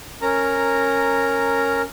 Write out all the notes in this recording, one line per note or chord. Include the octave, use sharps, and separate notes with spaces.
C#4 A#4 A#5